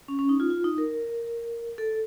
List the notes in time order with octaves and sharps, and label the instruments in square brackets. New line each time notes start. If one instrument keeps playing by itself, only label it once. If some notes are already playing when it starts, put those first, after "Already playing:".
[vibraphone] C#4
C#4
D#4
F4
F4
D#4
A#4
A4